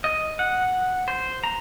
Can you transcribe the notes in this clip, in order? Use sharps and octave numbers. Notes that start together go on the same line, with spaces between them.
D#5
F#5
C5
A#5